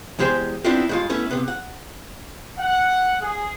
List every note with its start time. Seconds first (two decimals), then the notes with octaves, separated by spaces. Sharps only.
0.19 E2 G#3 G4 G#4 C5
0.64 B3 C4 D4 E4 F4 G4
0.89 G2 G#3 F4
1.10 A3 B3 C#4 E4
1.31 C3 B3
1.48 F#5
2.59 F#5
3.22 G#4